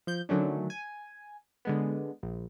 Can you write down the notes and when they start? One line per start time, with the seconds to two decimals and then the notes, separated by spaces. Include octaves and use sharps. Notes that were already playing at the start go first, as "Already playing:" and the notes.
0.07 F3 G6
0.29 D3 D#3 F#3 A3 C#4 D4
0.70 G#5
1.65 D3 G#3 B3
2.23 A#1